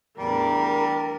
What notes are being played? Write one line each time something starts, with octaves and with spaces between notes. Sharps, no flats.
E2 A2 G3 D4 A#4